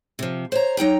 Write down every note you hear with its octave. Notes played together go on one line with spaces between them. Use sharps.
C3 F3
C5 C#5 A#5
F#3 D#4 G5 A#5